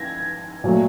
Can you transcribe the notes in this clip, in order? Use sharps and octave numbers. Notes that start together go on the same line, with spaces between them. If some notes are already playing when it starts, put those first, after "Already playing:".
Already playing: G#6 A#6
A#2 F#3 A3